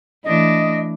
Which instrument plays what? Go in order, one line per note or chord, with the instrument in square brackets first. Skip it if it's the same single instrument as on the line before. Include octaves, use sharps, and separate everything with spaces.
[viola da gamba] E3 A3 D4 [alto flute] D#5